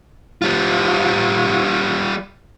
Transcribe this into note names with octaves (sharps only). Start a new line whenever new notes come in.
G3 F4